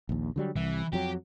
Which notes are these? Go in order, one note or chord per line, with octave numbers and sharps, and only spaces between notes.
A#1 D#2
D3 F#3 G3
C2 E3
F2 F#3 G4